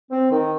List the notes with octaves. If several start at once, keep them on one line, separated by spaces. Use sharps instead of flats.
C4
D#3